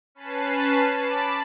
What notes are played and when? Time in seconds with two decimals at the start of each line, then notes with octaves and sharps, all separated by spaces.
0.15 C#4 B4 A5 C7
0.96 A5 B5 D6